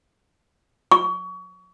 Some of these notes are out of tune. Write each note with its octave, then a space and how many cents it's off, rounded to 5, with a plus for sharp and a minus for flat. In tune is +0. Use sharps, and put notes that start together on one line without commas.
C#6 +30